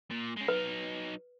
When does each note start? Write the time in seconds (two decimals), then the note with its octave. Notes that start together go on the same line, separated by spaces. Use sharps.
0.11 A#2
0.37 G#3 C#4
0.48 F#3 D#4 B4